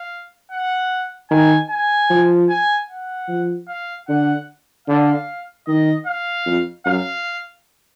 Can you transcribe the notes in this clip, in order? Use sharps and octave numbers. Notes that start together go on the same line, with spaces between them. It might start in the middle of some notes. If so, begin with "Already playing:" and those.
Already playing: F5
F#5
D#3 G#5
G#5
F3
G#5
F#5
F3
F5
D3 F#5
D3 F5
D#3 D#5
F5
F2
F#2 F5